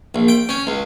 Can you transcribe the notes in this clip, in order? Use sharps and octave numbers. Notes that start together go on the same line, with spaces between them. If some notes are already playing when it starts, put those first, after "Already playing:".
A#1
G5
C#4
C#2